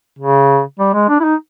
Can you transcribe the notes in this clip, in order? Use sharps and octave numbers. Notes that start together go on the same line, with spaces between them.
C#3
G3
G#3
D4
E4
D#4